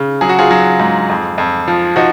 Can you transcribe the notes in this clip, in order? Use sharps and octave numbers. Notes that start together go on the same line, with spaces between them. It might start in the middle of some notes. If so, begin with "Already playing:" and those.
Already playing: C#3
F#3 G#4
F#4
F4 G#4
F#3
G#2
F2
F2
F3
F3 D#4 F#4